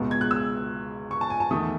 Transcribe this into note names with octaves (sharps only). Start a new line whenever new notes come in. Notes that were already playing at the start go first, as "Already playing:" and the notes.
Already playing: C#2 B2 G#3 B3
G#6
F#6
E6
C#6
A5
G#5
A5
E2 D#3 A3 D#6